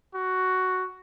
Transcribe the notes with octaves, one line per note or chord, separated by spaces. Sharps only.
F#4